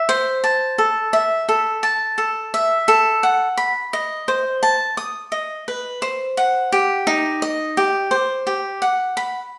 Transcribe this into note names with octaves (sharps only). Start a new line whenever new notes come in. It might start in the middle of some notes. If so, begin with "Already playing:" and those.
Already playing: E5
C5
A5
A4
E5
A4
A5
A4
E5
A4
F#5
B5
D#5
C5
A5
D#6
D#5
B4
C5
F#5
G4
D#4
D#5
G4
C5
G4
F#5
B5